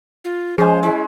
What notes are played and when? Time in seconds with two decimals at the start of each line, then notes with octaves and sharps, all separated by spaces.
0.25 F4
0.58 F3 G#3 C#4 G#4 C5 G#5
0.83 G#3 E4